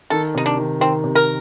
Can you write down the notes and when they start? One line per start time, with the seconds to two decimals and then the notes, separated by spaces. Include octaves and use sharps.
0.10 D#3 A4
0.35 C3 D#4
0.46 D4
0.57 D#3
0.80 D#3 C4
1.04 C3
1.15 A#4